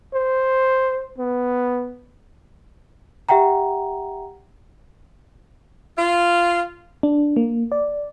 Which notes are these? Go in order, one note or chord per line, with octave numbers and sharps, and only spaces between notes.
C5
B3
G4 E5 F#5 G5 A#5
F4
D4
A#3
D5